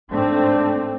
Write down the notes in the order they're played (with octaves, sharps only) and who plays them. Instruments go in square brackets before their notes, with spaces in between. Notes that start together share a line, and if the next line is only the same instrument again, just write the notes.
[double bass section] G#2 A3 C4 [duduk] D4